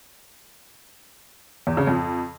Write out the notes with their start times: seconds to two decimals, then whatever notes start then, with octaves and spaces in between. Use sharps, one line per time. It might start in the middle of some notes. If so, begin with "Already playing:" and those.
1.67 E2
1.77 C#3
1.87 F2